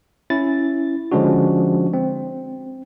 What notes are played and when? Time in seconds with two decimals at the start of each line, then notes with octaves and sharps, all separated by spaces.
0.30 C#4 E4 A6
1.12 D3 F3 G#3 C#4 D4 F#4
1.93 C4